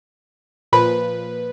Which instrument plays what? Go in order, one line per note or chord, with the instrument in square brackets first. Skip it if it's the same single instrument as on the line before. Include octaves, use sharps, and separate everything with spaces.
[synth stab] A#2 F3 B4